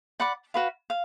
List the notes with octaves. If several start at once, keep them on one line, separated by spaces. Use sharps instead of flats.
D5 F#5 B5 D6
F#4 B4 F5
F5